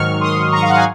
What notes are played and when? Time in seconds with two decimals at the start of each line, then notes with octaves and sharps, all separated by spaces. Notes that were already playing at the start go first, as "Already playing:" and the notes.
Already playing: G#2 D#3 F#3 C#6 F6
0.20 C6 D#6
0.52 A#5 C#6
0.62 F5
0.69 F#5
0.77 G#5